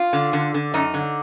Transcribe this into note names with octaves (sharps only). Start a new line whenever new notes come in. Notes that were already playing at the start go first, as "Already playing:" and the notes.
Already playing: F4
D3
D3
D3
F#2 D#4
D3